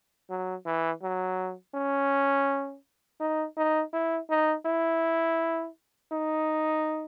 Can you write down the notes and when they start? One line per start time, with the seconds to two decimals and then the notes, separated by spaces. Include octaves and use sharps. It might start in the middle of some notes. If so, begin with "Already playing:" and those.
0.30 F#3
0.66 E3
1.02 F#3
1.75 C#4
3.20 D#4
3.57 D#4
3.93 E4
4.30 D#4
4.66 E4
6.12 D#4